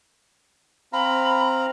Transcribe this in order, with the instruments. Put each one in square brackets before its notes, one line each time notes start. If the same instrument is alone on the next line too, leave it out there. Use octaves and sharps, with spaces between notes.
[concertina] C4 F5 A#5 [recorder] B5